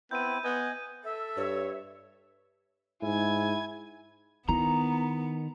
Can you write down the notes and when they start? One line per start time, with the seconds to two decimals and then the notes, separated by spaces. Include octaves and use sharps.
0.11 B3 C4 E4 G6 D#7
0.44 B3 D#5 G#5
1.04 A4 E5
1.37 G2 C#5
3.02 G#2 E4 G#5 G#6
4.49 D#3 B3 E4 A#5